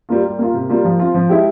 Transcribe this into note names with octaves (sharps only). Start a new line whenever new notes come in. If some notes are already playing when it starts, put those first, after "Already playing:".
G3 A#3 F4
G3
A#3 F4
C3
G3 A#3 F4
F3
C4 F4
F3
G#3 E4 G4